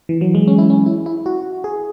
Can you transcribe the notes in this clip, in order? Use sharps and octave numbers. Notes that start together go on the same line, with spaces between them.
E3
F#3
G#3
C#4
E4
C#4
E4
E4
F#4
G#4